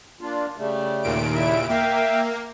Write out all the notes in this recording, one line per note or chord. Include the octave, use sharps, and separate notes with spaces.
A#3 D4 F4
C#3 G3 A3
D#2 A#2 D7
C#3 E4 E5
A#3 E5 F5 G5